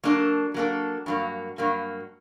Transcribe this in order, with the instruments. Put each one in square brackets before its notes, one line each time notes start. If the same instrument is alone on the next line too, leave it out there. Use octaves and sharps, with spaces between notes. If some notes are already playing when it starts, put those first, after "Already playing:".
[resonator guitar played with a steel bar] F#3 A#3 D4 A4
F#3 A#3 D4 A4
G2 F#3 A#3
G2 F#3 A#3